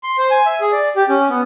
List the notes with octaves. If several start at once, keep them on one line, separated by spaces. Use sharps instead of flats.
C6
C5
G#5
E5
G#4
D5
G4
C#4
B3